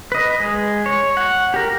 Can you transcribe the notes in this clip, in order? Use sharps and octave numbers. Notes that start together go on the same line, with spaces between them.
B4 D#5
G#3
C#5
F#5
G4 A#4